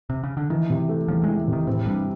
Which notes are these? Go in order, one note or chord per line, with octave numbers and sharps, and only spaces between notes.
C3
C#3
D3
D#3 E3
C3
A3
E2 F3
E3 G#3
C3
D#3
A2 C4
G2 G3